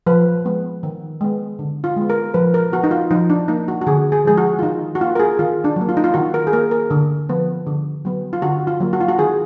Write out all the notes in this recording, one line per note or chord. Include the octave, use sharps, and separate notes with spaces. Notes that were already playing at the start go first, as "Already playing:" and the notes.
F3 B4
G#3 B3
D#3
G#3 B3
D3
F4
G#3 B3
A#4
F3 B4
A#4
B3 F#4
D#4
F4
F3 D#4
D4
A#3 D#4
F#4
F#4
D3 G#4
G#4
F3 G#3 G#4
F#4
F4
D#3 D#4
F#4
A#3 F4
A#4
G#4
D#3 F4
D4
F#3 A#3
F4
D#4
F4
D#3 F#4
A#4
G#4
A#3 A#4
A#4
D3
F3 B3
D3
F#3 B3
F4
D3 F#4
F4
F#3 A#3
F#4
F4
F#4
D#3 G#4